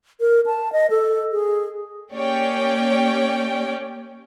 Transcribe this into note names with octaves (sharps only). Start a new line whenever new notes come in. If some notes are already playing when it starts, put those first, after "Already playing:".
A#4
A5
D#5
A4
G#4
A#3 C#4 G4 C#5 D5 G5